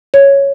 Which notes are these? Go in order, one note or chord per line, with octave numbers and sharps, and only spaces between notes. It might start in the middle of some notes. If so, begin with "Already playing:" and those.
C#5